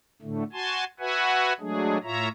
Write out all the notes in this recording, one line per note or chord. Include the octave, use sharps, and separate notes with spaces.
A2 D3 A3
F#4 G#5 A5 C6
F#4 B4 E5 F#5 G#5
F#3 G#3 A3 D4 G#4
A2 F4 C#5 E5 A#5